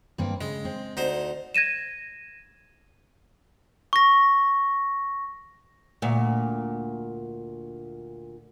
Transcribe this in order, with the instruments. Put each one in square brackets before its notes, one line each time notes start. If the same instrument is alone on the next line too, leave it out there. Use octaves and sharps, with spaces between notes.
[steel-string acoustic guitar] G2 A#3 C4
[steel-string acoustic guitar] C#3 [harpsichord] G#3
[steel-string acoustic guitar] C4
[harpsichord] D2 D#4 C5
[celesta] G#6 A#6 D#7 E7
[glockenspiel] C#6 A#6
[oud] D2 A#2